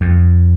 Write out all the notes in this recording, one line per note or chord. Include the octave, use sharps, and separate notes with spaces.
F2